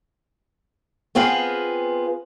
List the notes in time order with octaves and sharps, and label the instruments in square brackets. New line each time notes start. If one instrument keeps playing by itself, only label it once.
[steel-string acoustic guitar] B3 C4 F4 G#4 B4 F5